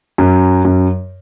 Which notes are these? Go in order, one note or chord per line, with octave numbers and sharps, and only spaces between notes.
F#2
F#2